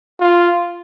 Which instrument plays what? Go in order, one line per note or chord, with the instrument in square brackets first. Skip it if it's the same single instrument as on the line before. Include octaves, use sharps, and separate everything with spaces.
[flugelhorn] F4